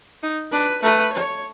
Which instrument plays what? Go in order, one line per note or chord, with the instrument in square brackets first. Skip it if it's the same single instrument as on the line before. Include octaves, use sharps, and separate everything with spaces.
[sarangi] D#4
[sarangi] D4 [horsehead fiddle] B4
[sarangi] A3 [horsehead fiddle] B4
[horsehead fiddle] C#5